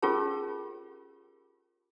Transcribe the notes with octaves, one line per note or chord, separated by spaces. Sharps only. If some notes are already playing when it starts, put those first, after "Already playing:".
C#4 F4 G4 G#4 A#4 A5